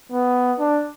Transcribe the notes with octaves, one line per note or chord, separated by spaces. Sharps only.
B3
D4